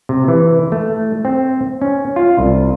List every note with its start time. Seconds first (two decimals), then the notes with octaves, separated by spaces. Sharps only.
0.09 C3
0.28 E3
0.72 A3
1.25 C4
1.82 C#4
2.16 F4
2.38 C2